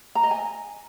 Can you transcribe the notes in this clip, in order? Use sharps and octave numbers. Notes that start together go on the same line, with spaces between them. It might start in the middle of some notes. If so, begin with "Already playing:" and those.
A#5
D#5
G#5